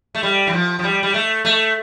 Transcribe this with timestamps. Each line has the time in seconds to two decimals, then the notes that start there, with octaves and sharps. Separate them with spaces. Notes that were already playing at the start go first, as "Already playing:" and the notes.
0.15 A3
0.23 G3
0.47 E3
0.53 F3
0.79 F3
0.84 G3
1.03 G3
1.14 A3
1.45 A3